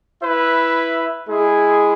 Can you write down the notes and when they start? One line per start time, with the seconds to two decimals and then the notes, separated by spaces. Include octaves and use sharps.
0.22 E4 B4 E5
1.28 G#3 E4 G#4